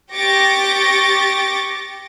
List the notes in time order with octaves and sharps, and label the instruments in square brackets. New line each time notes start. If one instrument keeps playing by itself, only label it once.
[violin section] G4 C#6 D6 A6 A#6 D7